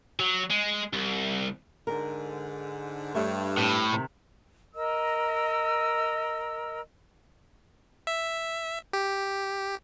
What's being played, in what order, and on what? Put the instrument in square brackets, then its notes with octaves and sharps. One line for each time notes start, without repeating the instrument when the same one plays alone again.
[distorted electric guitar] F#3
G#3
C2
[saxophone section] G#2 D3 [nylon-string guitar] A#4
[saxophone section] G2 [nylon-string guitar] A3 C#5 E5
[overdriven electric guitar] A2 [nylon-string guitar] C4 C#5
[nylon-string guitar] C3 D#3
[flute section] A#4 D#5 E6
[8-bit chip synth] E5
G4